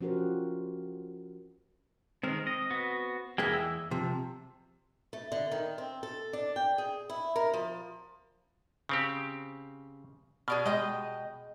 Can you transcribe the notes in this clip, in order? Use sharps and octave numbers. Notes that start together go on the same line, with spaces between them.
F3 C#4 F#4 G4 A#4 C5
D#3 G#3 C4 A#4
D#5
B3 F#4
E2 G#3 A#3 E4 G#4 G5
E6
C3 F3
A3
D3
D#3
C4
A4
D4
G5
G#4
E4
A#4
F3
C#3 C4 G4
B2 G#4 D5 F6
G#3 D#5 G5 D#6